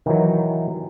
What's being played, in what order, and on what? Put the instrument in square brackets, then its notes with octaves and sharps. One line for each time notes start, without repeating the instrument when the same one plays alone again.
[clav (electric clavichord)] D#3 E3 F#3